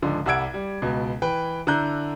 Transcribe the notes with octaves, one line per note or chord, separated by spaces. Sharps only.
C#2 G#2 D3 F3
C2 G3 F#5 E6 G#6 D7
G3
C#2 B2
E3 B4 G5
D3 E4 A#5 F#6 G6